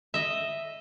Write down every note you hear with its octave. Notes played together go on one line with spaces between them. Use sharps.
D#5 E5